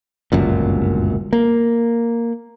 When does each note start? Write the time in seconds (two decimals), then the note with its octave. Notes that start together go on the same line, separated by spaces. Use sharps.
0.32 G1 C#2 F#2 A#2
1.33 A#3